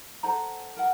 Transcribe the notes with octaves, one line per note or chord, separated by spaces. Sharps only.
A4 C5 F#5 A#5
A#4 F#5